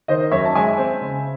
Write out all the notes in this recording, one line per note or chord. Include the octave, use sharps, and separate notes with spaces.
D#3 C5 D#5
F#2 C#5 E5
A5
G#3 E5 G#5
C4
C#3